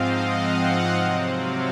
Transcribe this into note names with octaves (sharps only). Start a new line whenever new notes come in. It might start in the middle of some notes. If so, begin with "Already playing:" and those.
Already playing: G#2 F3 C4 D#5 F5
F#5
C3 F#3 C4
F5